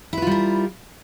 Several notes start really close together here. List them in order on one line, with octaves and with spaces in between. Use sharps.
E4 B4 F4 G3 A#4